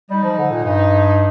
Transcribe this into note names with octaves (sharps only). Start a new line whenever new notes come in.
G3 D#4
F3
D3
A#2
G2 D#4